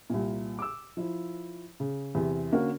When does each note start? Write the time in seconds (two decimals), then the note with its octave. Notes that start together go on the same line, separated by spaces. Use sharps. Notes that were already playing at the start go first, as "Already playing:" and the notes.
0.10 C2 A#2
0.59 D6 E6
0.97 F3 E4
1.80 C#3
2.15 E2 C3
2.52 D3 A#3 C#4 D4 F#4 A#4